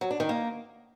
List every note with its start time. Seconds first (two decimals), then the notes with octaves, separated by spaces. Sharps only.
0.01 F#3
0.10 D4
0.20 D#3
0.29 A#3